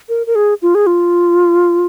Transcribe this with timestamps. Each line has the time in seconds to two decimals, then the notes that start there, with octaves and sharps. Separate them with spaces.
0.09 A#4
0.27 A#4
0.35 G#4
0.62 F4
0.75 G#4
0.87 F4